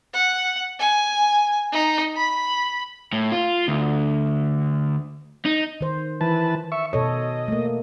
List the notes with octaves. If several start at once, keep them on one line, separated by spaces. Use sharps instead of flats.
F#5
G#5
D#4
B5
A2
F4
D2
D#4
D#3 C5
E3 B4 A5
E5 C#6
B2 A4 C#5 D#5
A3 A#3